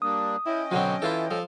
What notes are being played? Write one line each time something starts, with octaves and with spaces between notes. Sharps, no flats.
G3 A#3 D4 D#6
C#4 E4 D#5 G5
B2 D3 F#3 C4
E3 E4 F4 A4
F3 A4